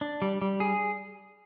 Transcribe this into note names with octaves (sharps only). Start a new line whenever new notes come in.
D4
G3
G3
G#4